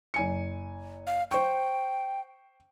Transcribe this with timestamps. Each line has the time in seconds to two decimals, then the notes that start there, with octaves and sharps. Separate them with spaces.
0.14 F#1 G#5 C#7
1.07 F5
1.31 C5 G5 C#6